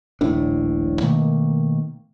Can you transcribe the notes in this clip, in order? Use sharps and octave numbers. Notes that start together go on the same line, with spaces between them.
D#1 A#1 A2 D4
B2 D#3 A3 A#3